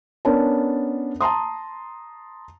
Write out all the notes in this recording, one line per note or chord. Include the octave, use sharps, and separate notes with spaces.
B3 C#4 D4 A#4 A5
A5 A#5 C6 D#6